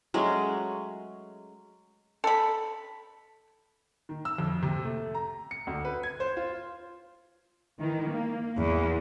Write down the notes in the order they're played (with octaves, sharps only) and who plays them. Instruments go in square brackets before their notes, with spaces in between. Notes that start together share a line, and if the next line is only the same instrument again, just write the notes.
[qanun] F#3 G#3 A3 C#4
[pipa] A4 B5
[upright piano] D#3
E6
F2
C3
A3
A#5
C#7
D2
B4
G#6
C5
F4
[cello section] D#3 E3
A#3
[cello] E2 [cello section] E3